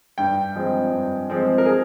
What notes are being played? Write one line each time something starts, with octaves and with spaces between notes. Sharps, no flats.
G2 G5
F3 G#3 C4
G2
F3 G#3 C4
A#4
G#4